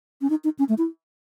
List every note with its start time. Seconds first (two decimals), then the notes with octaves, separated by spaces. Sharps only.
0.21 C#4
0.30 D#4
0.44 D#4
0.59 C#4
0.69 A3
0.78 E4